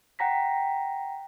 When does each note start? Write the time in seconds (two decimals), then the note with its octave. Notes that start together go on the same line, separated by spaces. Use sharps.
0.19 F#5 G5 A#5 A#6 B6